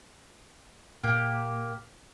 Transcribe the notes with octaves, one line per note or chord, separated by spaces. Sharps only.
A#2 A#3 G4